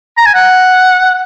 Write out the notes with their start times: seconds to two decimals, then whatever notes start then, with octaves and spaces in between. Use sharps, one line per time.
0.18 A#5
0.26 G#5
0.34 F#5